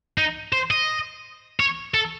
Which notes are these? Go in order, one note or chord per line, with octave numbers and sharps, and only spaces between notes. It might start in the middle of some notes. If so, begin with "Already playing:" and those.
D#4
C5
D#5
C#5
A4